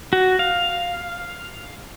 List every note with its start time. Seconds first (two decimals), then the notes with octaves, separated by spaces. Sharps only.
0.13 F#4
0.39 F5